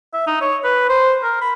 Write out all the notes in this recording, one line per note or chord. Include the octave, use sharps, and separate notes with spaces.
E5
D#4
C#5
B4
C5
A#4
B5